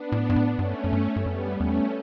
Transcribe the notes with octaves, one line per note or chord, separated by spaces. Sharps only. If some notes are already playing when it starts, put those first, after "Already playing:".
Already playing: B3 D4
A2
G2
A2
G2 A3 C#4
F#2
G2
G2
F#2 G3 B3
E2 A3 C#4